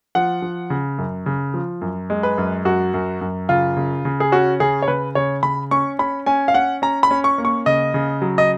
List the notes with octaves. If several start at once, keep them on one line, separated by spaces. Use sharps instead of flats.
F3 F#5
F3
C#3
F#2
C#3
F3
F#2
G#3
B4
F#2
F#2 F#4
F#2
F#2
C#3 F4
C#3
C#3
G#4
C#4 F#4
C#3 G#4
C#5
C#3 B4
C#3 C#5
C#3 B5
C#4 C#6
C#4 B5
C#4 G#5
F5
C#4 F#5
C#4 A#5
B5
C#4
C#6
A#3
C#6
C#3 D#5
C#3
F#3
D#5